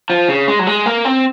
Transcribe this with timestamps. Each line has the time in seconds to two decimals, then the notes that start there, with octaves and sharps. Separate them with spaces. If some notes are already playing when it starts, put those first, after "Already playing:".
0.10 F3
0.29 C#3
0.48 G#3
0.59 F#3
0.67 G#3
0.86 A#3
1.05 C4